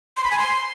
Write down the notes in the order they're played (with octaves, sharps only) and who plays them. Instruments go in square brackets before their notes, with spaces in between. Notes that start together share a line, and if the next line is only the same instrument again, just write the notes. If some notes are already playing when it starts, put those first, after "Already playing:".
[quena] C6
B5
G#5
C6